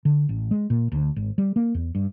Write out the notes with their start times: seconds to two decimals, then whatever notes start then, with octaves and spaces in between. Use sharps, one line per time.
0.05 D3
0.29 A1
0.51 G#3
0.70 A#2
0.92 D2
1.16 G#1
1.38 G3
1.56 A#3
1.74 E2
1.95 G2